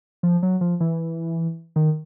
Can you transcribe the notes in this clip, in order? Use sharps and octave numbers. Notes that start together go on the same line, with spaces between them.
F3
F#3
F3
E3
D#3